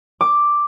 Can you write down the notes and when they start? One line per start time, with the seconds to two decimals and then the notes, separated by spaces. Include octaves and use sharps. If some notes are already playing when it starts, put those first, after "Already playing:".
0.21 D6